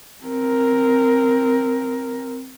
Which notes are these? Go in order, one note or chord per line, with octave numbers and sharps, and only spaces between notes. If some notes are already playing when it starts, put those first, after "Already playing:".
C4 A#4